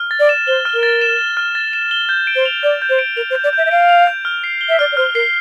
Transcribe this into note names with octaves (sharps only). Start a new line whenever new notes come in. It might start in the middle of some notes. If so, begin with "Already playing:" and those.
Already playing: F6
A6
D5
E7
C5 G7
F6
A#4
A6
E7
G7
F6
A6
E7
G7
G6
D7
C5
F7
D5 G6
G6
C5
D7
A#4 F7
C5
G6
D5
E5 G6
E5
F5 D7
F7
G6
F6
C7
G7
E5
D5 F6
D5
C5 F6
A#4 C7